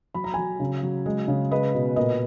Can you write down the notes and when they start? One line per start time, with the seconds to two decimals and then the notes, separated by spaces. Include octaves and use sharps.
0.14 F#3 B5
0.24 A#5
0.34 F#3 G#5 B5
0.60 C#3
0.83 F#3
1.06 G#3
1.28 C#3
1.51 G#3 B4 D#5
1.75 B2
1.96 A#2 B4 D#5